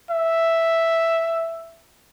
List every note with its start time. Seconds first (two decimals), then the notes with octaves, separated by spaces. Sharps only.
0.10 E5